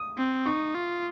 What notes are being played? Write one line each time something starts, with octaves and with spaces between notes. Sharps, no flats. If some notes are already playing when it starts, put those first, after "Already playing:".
Already playing: D#6
C4
D#4 C#6
F4